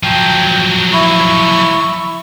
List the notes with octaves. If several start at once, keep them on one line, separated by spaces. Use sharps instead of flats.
F3 F#3 G5
E4 C#6